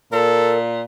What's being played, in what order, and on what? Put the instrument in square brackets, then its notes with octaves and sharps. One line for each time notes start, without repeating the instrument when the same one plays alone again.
[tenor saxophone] A#2 [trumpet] A4 [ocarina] A#4